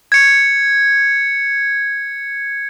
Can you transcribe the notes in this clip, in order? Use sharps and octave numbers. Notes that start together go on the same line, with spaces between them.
G#6 C#7